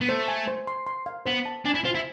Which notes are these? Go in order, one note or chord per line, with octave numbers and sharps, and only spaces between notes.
B3
A3 C5
G#5
C5
C6
C6
F5
B3 C5
A5
D4 G#5
E4
F4 C5
E4